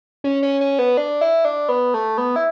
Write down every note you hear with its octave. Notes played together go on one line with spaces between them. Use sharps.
C#4
C#4
C#4
B3
D4
E4
D4
B3
A3
B3
E4